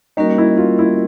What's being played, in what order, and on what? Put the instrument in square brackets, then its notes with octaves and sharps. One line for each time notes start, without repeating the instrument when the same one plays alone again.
[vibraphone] G3 A#3 C#4 F#4 A#4 [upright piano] D#4
[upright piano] E4
F4
E4